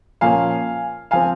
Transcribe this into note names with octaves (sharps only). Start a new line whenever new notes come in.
A#2 F3 A#3 C#4 F5 G#5
F3 C4 F5 G#5